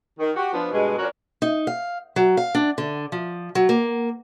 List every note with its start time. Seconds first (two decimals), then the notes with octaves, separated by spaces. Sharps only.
0.19 D#3
0.36 F#4 G4
0.54 F3 B3 D4
0.72 G2 B2 G#3
0.99 F3 C#4 D4 F#4 A#4 C#5
1.42 D#4
1.67 F5
2.16 F#3
2.37 F5
2.55 D4
2.78 D3
3.12 F3
3.55 F#3
3.69 A#3